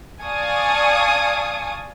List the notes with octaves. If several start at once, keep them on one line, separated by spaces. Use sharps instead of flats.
D5 F5 G#5 A5 C#6 D#6